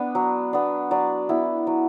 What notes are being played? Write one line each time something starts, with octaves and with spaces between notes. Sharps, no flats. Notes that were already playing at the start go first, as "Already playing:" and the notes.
Already playing: B3 D4
F#3
B3 D4
F#3 D5
B3 E4
F#3